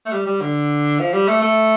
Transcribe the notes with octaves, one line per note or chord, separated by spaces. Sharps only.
A3
G3
G3
D3
F3
G3
A3
A3